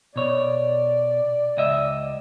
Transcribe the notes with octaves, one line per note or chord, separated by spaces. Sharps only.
B2 C#5 D5
C#2 D#5 E5